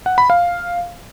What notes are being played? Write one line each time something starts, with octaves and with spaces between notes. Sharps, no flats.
F#5
B5
F5